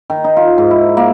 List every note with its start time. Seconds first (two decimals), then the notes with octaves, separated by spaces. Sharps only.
0.10 D#3
0.24 D#4
0.37 F4
0.58 G#2
0.71 E4
0.97 A#3